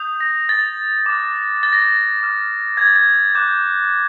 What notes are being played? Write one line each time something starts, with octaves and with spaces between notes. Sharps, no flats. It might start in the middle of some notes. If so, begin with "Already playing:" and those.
Already playing: D#6 G6
A#6
A6
D6 F#6
A6
A#6
A6
D6 F6
G#6
A6
G#6
D6 F#6 G6